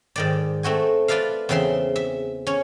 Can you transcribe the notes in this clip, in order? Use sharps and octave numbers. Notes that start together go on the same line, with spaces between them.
G#2 D#3 D5
A3 C4 F#4 G#5
F4 B4 D5 E5 F5
E2 C#3 C4 E5 C6
E5
C#4 C#5